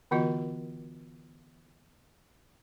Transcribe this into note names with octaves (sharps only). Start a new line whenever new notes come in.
D3 E3 B3 F4 F#4 D#5